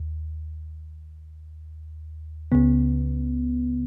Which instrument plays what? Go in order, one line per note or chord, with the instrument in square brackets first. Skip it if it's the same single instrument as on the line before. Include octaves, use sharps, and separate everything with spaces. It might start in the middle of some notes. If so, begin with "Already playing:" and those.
Already playing: [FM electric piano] D#2
C#2 C#3 B3